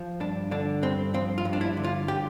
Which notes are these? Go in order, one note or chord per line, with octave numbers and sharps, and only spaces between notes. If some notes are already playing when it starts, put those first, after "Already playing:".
Already playing: F3
G2 D4
D3 D4
G2 C4
F3 C4
F4
G2
D4
E4
D3
F4
G4